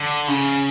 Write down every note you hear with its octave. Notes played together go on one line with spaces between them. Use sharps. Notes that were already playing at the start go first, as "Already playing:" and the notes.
Already playing: D3
C#3